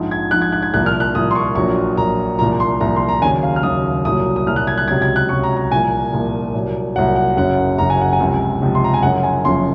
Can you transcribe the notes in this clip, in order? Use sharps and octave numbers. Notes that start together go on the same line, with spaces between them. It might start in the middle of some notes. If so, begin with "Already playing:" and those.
Already playing: A#1 G#2 F3
G#6
A#1 G#2 F3 F#6
G#6
F#6
G#6
C2 A#2 F3 F#6
F6
F#6
C2 A#2 F3 D#6
C6
C#6
A#1 A#2 F#3 C#6
A#1 A#2 F#3 A#5
C2 A#2 F3 A#5
C6
C2 A#2 F3 A#5
C6
A#5
D#2 C#3 F#3 G#5
F5
F6
D#2 C#3 F#3 D#6
C2 A#2 F#3 D#6
D#6
C2 A#2 F#3 F6
F#6
G#6
F#6
C#2 C3 F#3 G#6
G#6
F#6
C#2 C3 F#3 C#6
A#5
A#5
C2 A#2 F3 G#5
C2 A#2 F3
C2 A#2 F#3
C2 A#2 F#3 F#5
F#5
F#1 F#2 C#3 F#3 F#5
F#1 F#2 C#3 F#3 A#5
G#5
F#5
G#5
C#2 C3 F3
C#2 C3 F3
C6
A#5
G#5
F#1 F#2 C#3 F3 F#5
G#5
F#1 F#2 C#3 F3 C6